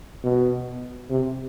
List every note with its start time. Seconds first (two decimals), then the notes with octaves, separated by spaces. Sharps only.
0.24 B2
1.10 C3